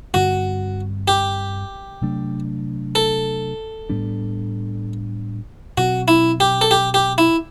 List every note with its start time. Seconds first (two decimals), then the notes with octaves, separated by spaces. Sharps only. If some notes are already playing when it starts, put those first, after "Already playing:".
0.13 G2 D3 G3 C4 F#4
1.08 G4
2.01 C3 F#3 A3 D4
2.95 A4
3.89 A2 G3 B3 D4
5.77 B2 F#3 C4 F#4
6.08 E4
6.40 G4
6.61 A4
6.71 G4
6.94 G4
7.18 E4